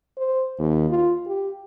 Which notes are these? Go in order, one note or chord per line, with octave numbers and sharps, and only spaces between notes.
C5
D#2
F4
G4